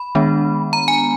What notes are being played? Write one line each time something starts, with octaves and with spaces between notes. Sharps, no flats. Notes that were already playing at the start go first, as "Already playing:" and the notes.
Already playing: B5
D#3 G#3 B3 D4
A#5
G#5